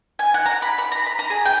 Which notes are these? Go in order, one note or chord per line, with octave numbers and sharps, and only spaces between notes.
G#5
F#5
A#5
B5
B5
A#5
B5
A#5
G#4
G5